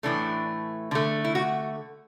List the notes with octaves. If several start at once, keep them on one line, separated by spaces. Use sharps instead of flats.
A2 E3 A3 D4
D3 A3
E4
F#4